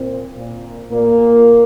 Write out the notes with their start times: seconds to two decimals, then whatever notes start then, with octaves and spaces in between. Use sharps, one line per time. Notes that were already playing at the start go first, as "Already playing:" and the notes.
Already playing: A#2 C4
0.37 A#2
0.92 A#2 A#3